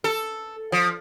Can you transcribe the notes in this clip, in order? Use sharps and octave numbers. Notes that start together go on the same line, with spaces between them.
A4
F3